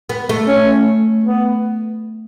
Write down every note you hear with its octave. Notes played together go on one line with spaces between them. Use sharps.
B3
A3
C#4
B3